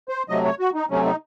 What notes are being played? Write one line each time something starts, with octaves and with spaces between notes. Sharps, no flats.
C5
C3 F#3 A3 D#5
C#5
F#4
D#4
C3 F#3 A3 C#4
D#4